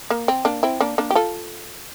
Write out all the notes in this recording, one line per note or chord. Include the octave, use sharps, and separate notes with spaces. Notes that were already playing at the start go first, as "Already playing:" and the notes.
A#3
C4
A#3 D4
C4 E4
A#3 D4
A#3 D4
G4
F4 A4